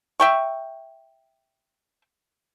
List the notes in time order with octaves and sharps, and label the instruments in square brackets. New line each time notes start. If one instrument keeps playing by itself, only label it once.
[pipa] E5 G5 C#6